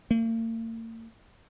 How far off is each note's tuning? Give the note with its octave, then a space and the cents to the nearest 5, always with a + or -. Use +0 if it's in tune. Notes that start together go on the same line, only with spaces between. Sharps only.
A#3 -45